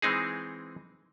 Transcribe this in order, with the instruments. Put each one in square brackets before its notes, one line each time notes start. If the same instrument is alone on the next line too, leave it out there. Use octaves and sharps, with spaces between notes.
[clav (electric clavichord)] E3 G#3 C4 D#4 G#4